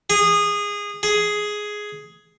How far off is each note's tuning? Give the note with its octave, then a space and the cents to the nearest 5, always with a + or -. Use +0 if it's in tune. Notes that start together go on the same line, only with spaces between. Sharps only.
G#4 -20
G#4 +5